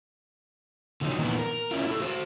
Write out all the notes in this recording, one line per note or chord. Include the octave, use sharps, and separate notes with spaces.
D3 D#3 F3 F#3 D#4
A#2 D#3 E3 B3
A#4
C#4 E4 F4
E4 F#4 A4
F#4 C5